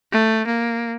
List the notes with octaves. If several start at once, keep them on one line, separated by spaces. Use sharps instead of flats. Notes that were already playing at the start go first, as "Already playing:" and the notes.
A3
A#3